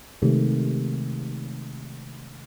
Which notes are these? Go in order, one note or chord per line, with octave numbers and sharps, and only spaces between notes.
C3 D#3 G#3 A3